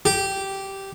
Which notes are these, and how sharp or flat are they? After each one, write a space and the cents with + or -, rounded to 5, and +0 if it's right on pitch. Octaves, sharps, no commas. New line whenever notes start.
G4 -10